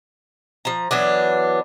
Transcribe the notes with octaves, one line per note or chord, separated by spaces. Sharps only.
F3 A#5
E3 F#3 B3 D4